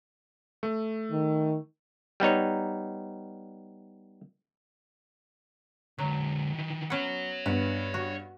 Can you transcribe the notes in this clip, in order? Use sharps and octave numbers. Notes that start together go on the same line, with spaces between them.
A3
D#3
G3 B3 D#4 C#5
D3 F#3 G#3
D#3 E3
B3 C#4 C#5 F#5
G2 B3 B4
F#4